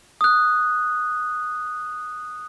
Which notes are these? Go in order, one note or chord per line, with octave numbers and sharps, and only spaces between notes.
D#6 F#6